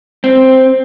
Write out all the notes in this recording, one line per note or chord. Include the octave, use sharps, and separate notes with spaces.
C4